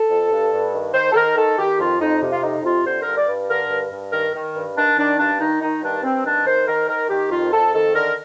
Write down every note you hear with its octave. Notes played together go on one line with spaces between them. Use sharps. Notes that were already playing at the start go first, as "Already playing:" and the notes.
Already playing: A4
F2
G2
G2
D#3
D#3 C5
A4
D#3 A#4
D#3 A4
D#3 G4
F2 F4
F2 D#4
C3
F4
F2 D#4
C3 F4
D3 C5
A#4
G2
D5
G2
D3 A#4
G2
G2
D#3 A#4
D#3
G2
D#3 D4
D#3 D4
G2 D4
D#3 D#4
D#3 D#4
G2 D4
G2 C4
D#3 D4
D#3 C5
D#3 A#4
D#3 A#4
D#3 G4
F2 F4
F2 A4
D#3 A4
D3 A#4